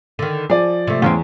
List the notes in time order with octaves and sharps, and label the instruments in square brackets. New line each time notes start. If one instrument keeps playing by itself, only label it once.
[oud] D3 D#3
[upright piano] F3 D5 [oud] G#4
[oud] C3 A3
[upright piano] E2 [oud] C4 C#4 F4